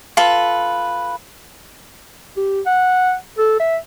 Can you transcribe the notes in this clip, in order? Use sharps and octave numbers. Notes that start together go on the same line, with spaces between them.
F4 A4 B4
G4
F#5
A4
E5